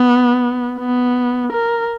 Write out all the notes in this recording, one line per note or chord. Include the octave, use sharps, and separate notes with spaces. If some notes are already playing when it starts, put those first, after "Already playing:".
Already playing: B3
B3
A#4